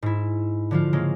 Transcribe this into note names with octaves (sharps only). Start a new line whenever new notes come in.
G#2 E4
D3 F3 F4
C#3 G#3 A#3